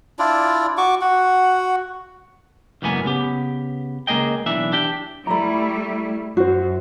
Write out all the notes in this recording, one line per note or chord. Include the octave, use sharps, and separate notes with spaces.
D4 E4 F4 D5
F#4 C#6 D6
F#4 F#5
C#2 F#2 A2 A#3 B3 G#5
C#3 B3 G4
C#2 A#3 G#4 D#5 G5
B1 E3 D4 E5
D4 G4 G5
G3 A3 E4 A#5 B5
F#2 F#4 C5